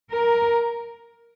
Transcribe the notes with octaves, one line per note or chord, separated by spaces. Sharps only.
A#4